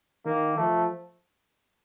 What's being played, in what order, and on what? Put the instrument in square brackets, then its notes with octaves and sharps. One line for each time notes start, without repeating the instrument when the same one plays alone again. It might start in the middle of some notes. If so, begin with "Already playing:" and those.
[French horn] D#3 [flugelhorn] A#3
[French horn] F3 [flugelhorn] A3